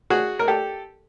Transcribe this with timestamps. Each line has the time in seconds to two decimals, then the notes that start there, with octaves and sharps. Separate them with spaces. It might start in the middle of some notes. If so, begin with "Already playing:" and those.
0.10 F#4 G#4
0.39 A#4
0.48 G4 A4